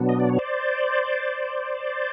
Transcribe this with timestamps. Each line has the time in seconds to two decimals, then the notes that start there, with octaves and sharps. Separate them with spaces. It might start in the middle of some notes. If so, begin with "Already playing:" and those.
Already playing: B2 F#3 B3 D4
0.09 D#5
0.20 D5
0.29 C#5
0.39 C5 D5